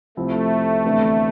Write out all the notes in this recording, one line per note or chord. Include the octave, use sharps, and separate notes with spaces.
C2 C3 F3 A3 C4 E4
D2 C3 E3 B3 D4